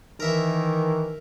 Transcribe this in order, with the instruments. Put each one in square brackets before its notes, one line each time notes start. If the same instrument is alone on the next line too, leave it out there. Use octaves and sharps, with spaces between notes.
[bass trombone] D#3 [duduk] E3 [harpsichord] A#4 E5